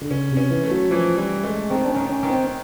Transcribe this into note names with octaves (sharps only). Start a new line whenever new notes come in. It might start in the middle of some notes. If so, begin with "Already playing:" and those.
D3
C#3 C#4
C3
C#4
E3
A3
F#3
E3 F3
E3 G3
G#3 A3
D#3 C4
D4
C#4
D#3
C#4
D#3
C4